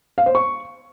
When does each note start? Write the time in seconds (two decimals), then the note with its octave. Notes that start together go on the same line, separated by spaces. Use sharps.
0.18 F5
0.26 C5
0.35 C#6